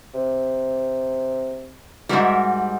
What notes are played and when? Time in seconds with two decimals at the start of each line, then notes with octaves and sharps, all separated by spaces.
0.14 C3
2.09 G#2 G3 F#4 A#4 E5